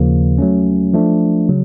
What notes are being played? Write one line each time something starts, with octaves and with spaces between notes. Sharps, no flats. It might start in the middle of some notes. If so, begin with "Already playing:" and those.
Already playing: D#2 C#3 F3 A#3
F#3 A3 C#4
F3 A3 D4
C#3 F#3